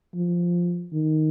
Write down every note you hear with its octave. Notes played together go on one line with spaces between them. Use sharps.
F3
D#3